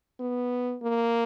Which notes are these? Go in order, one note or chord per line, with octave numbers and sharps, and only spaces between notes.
B3
A#3